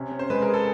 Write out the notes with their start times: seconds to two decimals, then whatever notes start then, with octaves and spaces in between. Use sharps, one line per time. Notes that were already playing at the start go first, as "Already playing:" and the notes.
Already playing: C3 C#4
0.12 C#4
0.19 C5
0.30 G#3 B4
0.42 A#4
0.48 G#4
0.54 A4